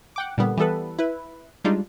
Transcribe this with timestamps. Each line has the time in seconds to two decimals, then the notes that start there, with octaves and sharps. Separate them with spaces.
0.16 F#5 G5 D6
0.38 A#2 D3 G3 B3
0.57 E3 G3 B3 A4 B4
0.98 E4 B4
1.64 G3 G#3 D4 D#4 F4